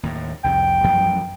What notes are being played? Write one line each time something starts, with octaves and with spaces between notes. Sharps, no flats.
D#2 A2
C2 F2 G5
A1 F#2 F3